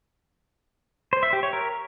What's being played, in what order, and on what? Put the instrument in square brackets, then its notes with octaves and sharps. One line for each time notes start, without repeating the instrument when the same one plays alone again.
[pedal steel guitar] C5
E5
G4
C#5
A#4